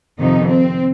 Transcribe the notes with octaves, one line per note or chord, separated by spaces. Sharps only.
F2 C3 D#3 D#4
C4